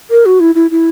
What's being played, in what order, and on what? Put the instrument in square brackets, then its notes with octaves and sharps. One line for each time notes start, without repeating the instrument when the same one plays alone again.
[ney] A#4
F#4
E4
E4
E4